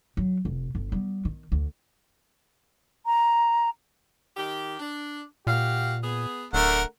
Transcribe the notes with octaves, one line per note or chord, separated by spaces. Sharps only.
F#3
F1
G1
G3 B3
D#3
D2
A#5
D#3 G4
D4
A#2 F#4 G4 F5
B3 G#4
D1 D3 A3 A#4 F#5